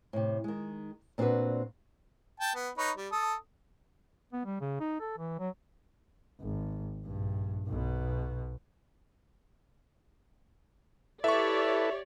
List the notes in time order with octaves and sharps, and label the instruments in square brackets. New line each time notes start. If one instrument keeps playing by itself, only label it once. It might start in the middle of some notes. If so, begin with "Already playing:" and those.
[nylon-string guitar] A2 C3
D#3 G#3
A#2 C4 D4 F4 F#4 B4
[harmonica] G5 A5
B3
D#4 B4 C#5
G3
A4 D#6
[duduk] B3
G3
C#3
D#4
A4
E3
F#3
[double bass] G#1
A#1 G2
B1 B2
[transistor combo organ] E4 A4 B4 [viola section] G4 C#5 D5 [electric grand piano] E5 C#6